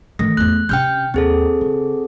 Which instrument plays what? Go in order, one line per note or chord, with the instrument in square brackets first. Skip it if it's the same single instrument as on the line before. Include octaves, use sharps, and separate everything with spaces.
[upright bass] D#3 E3 [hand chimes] A3
[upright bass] E2 A3 [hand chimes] F#6
[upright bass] C3 C#4 [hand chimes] G5 F6 G6
[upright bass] D#2 [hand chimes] C4 G#4 A4
[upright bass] C#3